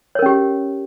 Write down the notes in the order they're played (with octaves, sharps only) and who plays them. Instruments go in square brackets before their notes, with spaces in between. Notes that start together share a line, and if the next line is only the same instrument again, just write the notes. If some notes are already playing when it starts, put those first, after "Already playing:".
[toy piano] C#5
A#4
C#4
G4